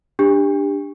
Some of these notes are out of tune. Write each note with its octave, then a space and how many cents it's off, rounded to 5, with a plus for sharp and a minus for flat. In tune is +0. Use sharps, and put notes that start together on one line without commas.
D4 +5 G4 +20